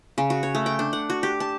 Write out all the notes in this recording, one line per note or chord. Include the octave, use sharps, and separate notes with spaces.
C#3
F#4
C#5
A3
G5
D4
F#5
F#4
G4
A5